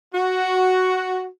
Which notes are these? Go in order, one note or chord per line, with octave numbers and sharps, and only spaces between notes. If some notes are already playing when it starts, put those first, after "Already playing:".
F#4